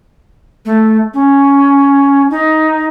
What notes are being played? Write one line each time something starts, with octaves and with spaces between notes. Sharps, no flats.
A3
C#4
D#4